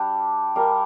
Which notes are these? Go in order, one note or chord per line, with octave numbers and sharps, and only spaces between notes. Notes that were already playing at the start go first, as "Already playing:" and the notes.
Already playing: G3 D4 G4
G3 D4 A#4 F5